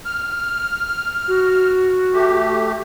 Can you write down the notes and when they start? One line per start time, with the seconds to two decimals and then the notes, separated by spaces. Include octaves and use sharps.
0.05 F6
1.28 F#4
2.13 A3 G4